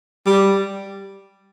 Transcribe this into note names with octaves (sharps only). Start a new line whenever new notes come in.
G3